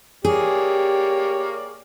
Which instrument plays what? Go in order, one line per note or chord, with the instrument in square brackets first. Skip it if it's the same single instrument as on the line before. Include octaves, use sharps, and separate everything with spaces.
[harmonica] A#3 C#5 D5 [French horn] G4 [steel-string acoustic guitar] G#4